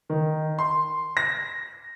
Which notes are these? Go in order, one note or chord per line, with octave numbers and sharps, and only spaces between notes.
D#3
C6
A#6